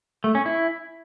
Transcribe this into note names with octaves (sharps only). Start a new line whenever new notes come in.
A3
C#4
E4